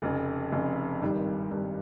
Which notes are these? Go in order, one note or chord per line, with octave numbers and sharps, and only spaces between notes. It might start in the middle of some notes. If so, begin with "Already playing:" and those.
F1 F2 C#3
F1 F2 C#3
G#1 G2 D#3 G3
G#1 G2 D#3 G3